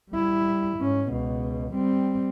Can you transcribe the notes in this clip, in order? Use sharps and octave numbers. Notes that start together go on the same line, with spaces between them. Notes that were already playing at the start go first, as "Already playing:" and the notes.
G3 E4
G#2 C#4
C#2 B2
G3 C4